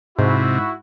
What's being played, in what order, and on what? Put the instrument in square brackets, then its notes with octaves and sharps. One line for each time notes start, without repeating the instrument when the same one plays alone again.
[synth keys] G#2 [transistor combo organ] C3 [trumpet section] E4 F#4